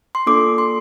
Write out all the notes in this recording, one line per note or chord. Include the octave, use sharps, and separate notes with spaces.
C6
A#3 D4 F4 A4 D6
C6